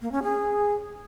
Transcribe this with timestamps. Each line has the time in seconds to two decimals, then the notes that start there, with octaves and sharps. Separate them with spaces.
0.01 A#3
0.12 C#4
0.23 G#4